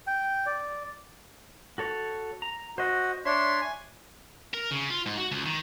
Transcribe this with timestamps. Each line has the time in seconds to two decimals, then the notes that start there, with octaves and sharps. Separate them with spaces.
0.07 G5
0.46 D5
1.78 F#4 A4 C#5
2.42 A#5
2.78 F#4 C5 D#5
3.25 D4 C#5 E5 C6
3.61 G#5
4.54 A#4
4.71 C#3
4.90 F4
5.06 G#2
5.18 F#4
5.32 C#2
5.46 D#3